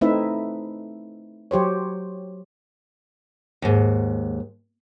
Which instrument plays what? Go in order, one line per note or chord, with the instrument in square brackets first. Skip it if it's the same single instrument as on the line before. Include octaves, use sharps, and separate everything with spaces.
[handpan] A3 C4 D#4 E4 B4 E5
F#3 G4 C5 C#5
[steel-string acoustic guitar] D#2 G#2